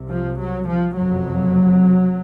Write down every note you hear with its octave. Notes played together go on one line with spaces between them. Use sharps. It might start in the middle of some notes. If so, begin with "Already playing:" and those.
Already playing: C2 C3
F3
F#3
F3
F#1 F2 C3 F#3